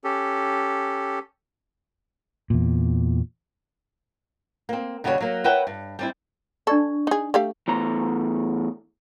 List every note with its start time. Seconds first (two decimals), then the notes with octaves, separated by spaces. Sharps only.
0.04 C#4 G4 A4
2.50 E2 A#2
4.69 A#3 C4
5.04 D#2 C#3 G3 F#4 G#4 C#5
5.21 F#3 A#3
5.44 A#4 B4 C#5 E5 F#5 G5
5.67 G2
5.99 G3 C4 E4
6.67 D4 A4 D5 C#6
7.07 D#4 G#4
7.34 A3 G4 F5
7.68 E2 A2 A#5